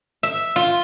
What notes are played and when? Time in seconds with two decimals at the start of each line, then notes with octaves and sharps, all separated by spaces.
0.23 E5
0.56 F4